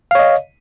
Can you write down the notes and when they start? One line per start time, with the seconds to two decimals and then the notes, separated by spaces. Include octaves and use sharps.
0.11 F5
0.15 C#5
0.19 D#5